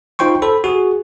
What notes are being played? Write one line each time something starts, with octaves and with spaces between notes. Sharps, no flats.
D#4 F4 C5 G5 C6 C#6
A4 C5 B5
F#4 G#4